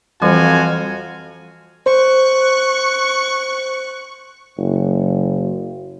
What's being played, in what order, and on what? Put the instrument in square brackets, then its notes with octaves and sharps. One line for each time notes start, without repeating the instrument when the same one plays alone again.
[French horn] F2 [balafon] E3 G3 C5 [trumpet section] F4 F#4 G#5
[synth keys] C5 [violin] C#6 F#6
[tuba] F#1